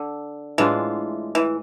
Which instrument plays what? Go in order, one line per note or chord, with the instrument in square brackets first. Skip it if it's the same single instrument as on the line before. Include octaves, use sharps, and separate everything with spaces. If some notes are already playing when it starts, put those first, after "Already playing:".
Already playing: [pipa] D3
[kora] A2 G#3 D4 F4 [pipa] E3
[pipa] E3